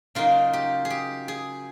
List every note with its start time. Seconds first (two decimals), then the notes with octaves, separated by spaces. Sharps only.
0.15 C#3 F#3 A#3 D#4 F4
0.53 G4
0.85 G#4
0.90 G4
1.28 G#4